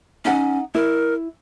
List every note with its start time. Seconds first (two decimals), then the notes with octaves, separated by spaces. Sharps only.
0.25 C#4 D#4 F#5
0.75 E4 A#4